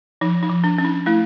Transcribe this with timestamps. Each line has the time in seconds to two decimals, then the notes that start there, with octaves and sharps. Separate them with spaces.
0.21 F3 D#4
0.43 D#4
0.50 F3
0.64 D4
0.78 C#4
0.84 D#4
1.06 A3 E4